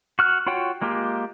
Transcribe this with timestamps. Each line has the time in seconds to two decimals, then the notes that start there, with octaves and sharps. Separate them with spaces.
0.19 F#4 F6 F#6
0.47 F4 F#4 C#5 F#5 G5
0.82 G#3 A#3 F4 G4